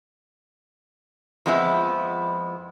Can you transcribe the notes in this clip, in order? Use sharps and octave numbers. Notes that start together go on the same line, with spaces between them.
F2 F3 G#3 B3 E4